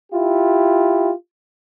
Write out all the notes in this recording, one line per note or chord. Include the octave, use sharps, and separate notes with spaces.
E4 F4 G4